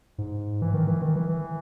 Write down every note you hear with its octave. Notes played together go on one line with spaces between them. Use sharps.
G#2
E3
D#3
E3
D#3
E3
E3